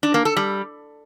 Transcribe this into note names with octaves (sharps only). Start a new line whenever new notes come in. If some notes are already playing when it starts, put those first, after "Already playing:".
D4
A#3
A4
G3